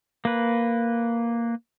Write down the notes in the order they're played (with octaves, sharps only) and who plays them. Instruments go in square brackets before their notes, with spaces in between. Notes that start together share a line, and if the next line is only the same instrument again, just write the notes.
[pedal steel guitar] A#3 B4